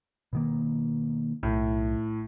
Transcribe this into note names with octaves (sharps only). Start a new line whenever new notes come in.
B2 D#3 A#3
B1 A2